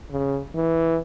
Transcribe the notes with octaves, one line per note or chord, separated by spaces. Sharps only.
C#3
E3